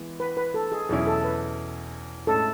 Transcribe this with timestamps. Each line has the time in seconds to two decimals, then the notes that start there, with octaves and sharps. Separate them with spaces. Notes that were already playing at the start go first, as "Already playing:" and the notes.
Already playing: E3 G#3 B3
0.20 B4
0.37 B4
0.54 A4
0.72 G#4
0.89 E2 B2 F#3 C#4 E4 G#4
1.07 A4
1.24 B4
2.27 A2 G#3 C#4 A4